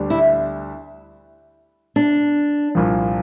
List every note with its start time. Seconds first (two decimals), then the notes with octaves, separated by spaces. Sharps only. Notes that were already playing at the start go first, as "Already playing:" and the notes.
Already playing: D2 D3 G3 D4
0.10 E4
1.96 D4
2.75 C2 A#2 F3